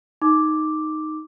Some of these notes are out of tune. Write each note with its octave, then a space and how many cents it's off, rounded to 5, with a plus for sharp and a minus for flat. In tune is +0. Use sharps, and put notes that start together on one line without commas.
D#4 +0 D6 +0